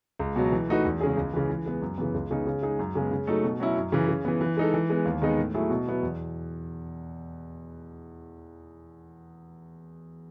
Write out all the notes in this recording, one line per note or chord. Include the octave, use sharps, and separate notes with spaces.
C#2
B2 F#3
E3
A3 D#4 F#4 B4
E2
C#3 G#3 C#4 G#4
C#2
C#3 E3
E3
G#3 B3
F#2
C#3 E3 B3
C#2
C#3 G#3 B3 D#4
C#3
G#3 D#4 G#4
F#2
C#3 G#3 B3
C#3
F#3 A3 D#4 A4
B2
F#3 C#4 E4
F#2
C#3 E3
C#3
E3 B3
E3
G#3 D#4 A4
E3
G#3 B3
D#2
D#3 G#3 B3 D#4
A2
F#3 A3 E4 G#4
B2
F#3 B3 E4
E2